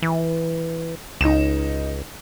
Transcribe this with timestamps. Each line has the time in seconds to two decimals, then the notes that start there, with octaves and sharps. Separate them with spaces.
0.02 E3
1.21 C#2 D#4 E7